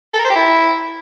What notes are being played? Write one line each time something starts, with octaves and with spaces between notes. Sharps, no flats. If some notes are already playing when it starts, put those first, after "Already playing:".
A4
A#4
C5
G4
E4